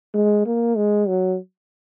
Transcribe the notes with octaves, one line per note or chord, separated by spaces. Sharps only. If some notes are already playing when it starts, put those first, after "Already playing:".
G#3
A#3
G#3
F#3